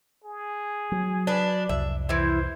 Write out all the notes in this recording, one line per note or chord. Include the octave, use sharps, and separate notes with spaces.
G#4
F#3
D4 B4
C2 F2 E5
E3 E4 C5